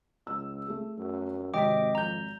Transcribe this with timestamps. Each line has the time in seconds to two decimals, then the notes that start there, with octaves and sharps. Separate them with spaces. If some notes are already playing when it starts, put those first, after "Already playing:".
0.27 C#2 E6
0.67 A3 G#4
0.98 F#2
1.54 G#1 C3 F#3 D#5 G5 D6 B6
1.95 F2 A#5 G6